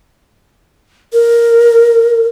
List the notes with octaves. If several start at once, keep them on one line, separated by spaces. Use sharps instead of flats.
A#4